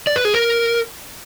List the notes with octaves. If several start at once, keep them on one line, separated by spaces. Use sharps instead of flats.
D5
B4
G#4
A#4